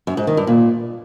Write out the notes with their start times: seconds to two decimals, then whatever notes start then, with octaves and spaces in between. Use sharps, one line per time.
0.07 F#2
0.17 G#2
0.27 D#3
0.37 G2
0.47 A#2